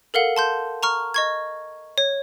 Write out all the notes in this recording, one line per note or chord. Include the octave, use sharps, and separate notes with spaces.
A4 A#4 F5 F#5
A5 C6 G6
A#5 C#6 F6
D#5 C#6 G#6
C#5